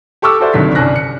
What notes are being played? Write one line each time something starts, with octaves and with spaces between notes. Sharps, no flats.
G4 A4 C#6 D6 E6
F#4 A4 C5 D5 E5
G1 D2 C3 D#3 F#3 B6
C2 G2 C#4 G#5 F#6 A#6
C#7